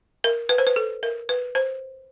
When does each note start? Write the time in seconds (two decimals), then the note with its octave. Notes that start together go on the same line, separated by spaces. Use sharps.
0.24 A#4
0.49 B4
0.58 C5
0.67 B4
0.76 A4
1.03 A#4
1.29 B4
1.55 C5